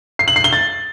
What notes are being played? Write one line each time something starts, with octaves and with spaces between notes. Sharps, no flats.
C7
F#7
C7
G7
A6